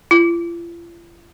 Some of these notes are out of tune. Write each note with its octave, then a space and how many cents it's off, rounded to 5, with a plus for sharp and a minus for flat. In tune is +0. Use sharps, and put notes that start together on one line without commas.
F4 -45